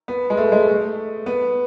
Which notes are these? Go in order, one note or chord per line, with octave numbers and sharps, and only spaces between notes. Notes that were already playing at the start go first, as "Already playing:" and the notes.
B3
G#3
A3
G#3
A3
B3